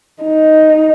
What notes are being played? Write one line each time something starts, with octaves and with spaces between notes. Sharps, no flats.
D#4